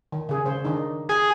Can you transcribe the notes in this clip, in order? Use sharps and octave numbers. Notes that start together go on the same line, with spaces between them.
D#3
C#3 G#4
C#3 C5
D#3 D4 D#4
G#4